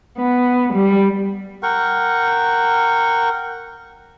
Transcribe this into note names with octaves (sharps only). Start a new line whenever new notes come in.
B3
G3
A#4 F#5 G5 C#6